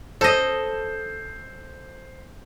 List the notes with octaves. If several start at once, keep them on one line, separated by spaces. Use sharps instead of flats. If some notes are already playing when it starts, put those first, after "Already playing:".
A4 C5 D#5